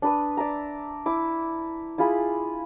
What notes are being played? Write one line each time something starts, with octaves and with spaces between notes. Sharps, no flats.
D4 B4 D#6
D5 E5 A#5
E4 D6
E4 F4 G#4 B5